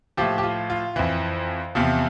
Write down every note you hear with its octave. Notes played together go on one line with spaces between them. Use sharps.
A2 F3 G4
G4
F4
F4
F2 E3
E2 C3 F3